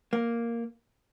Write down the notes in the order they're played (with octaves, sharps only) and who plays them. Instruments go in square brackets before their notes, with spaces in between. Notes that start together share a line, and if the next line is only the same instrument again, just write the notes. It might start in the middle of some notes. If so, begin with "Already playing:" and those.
[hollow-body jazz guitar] A#3